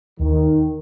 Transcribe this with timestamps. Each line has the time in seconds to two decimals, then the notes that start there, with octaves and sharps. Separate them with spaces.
0.19 D#2 D#3